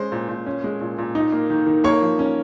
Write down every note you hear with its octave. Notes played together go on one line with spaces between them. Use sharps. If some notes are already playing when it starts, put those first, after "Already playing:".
Already playing: G#3 C#4 C5
A#2
A#2
C#4
G#3
A#2
A#2
D#4
A#3
D#3
D#3
A#3 C#5 C#6
F3
C#4